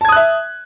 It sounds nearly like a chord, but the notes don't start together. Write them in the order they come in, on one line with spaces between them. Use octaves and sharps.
A5 G#6 D#6 F#6 E5